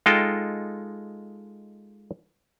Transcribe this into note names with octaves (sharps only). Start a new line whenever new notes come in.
G#3 D#4 F4 A4 D#5 G5